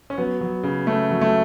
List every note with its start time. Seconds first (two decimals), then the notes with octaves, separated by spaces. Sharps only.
0.10 C#4
0.18 F#3 B3
0.41 F#3
0.63 C#3
0.87 C#3 A3
1.11 F#3
1.21 A3